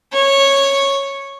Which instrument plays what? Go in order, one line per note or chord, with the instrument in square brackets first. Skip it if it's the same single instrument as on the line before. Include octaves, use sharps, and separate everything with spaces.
[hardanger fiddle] C#5